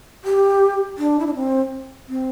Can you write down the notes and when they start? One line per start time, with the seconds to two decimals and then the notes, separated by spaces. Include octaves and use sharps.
0.24 G4
0.98 D4
1.19 E4
1.27 D4
1.35 C4
2.08 C4